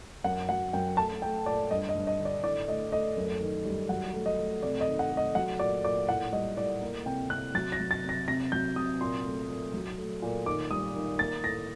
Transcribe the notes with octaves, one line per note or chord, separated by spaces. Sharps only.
F#2 F#5
F#3 F#5
F#2 G5
A3 A5
A3 G5
A#2 D5
G2 D#5
D#5
G2
D#5
D3
D5
A2 D5
A3 D#5
A3 D#5
F#2
D#3
G3
F#3 F#5
A3
D#5
A3
C3 D5
D#5
D#3
F#5
A3
D#5
F#3 F#5
A#2 D5
A#2 D5
A2 F#5
G3 D#5
A2 D5
A#3
C3 G5
C3 F#6
F#3 A6
A#6
F#3
A6
C3
A#6
C3 A#6
F#3 G6
C3 D#6
A#2 C6
A3
A#2
F#3
A3
A#2
D#3 D6
G3 D#6
D#3
A#3 A6
A2 A#6